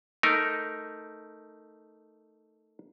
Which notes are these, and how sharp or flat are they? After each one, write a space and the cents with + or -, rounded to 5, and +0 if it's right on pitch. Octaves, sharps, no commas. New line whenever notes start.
A3 +0 D#4 +5 A#4 +0